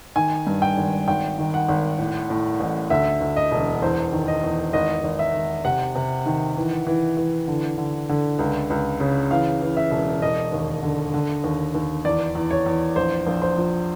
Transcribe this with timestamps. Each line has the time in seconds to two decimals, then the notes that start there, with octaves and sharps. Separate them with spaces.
0.16 D#3 G#5
0.47 G2
0.62 G5
0.77 G#1
1.08 G#1 G5
1.38 D#3
1.54 F#5
1.69 G#1
1.99 A2
2.30 A2
2.60 A1
2.90 D2 E5
3.21 D2
3.36 D#5
3.51 E1
3.82 E2 C5
4.12 D#3
4.28 D#5
4.43 E2
4.73 G#1 D#5
5.04 G#1
5.19 E5
5.34 G#1
5.64 C3 F#5
5.95 C3
6.26 D#3
6.57 E3
6.87 E3
7.17 E3
7.48 D3
7.78 D3
8.09 D3
8.39 C#2
8.70 C#2
9.00 C#3
9.31 E3 F5
9.61 E3
9.77 E5
9.91 E1
10.22 E1 D#5
10.52 D#2
10.83 D3
11.14 D3
11.44 D#2
11.75 D#2
12.05 E2 D5
12.35 E2
12.51 C#5
12.66 E2
12.96 A#1 C5
13.27 A#1
13.42 C5
13.57 F3